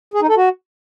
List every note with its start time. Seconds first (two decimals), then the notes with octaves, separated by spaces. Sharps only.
0.14 G#4
0.21 D#4
0.29 A4
0.36 F#4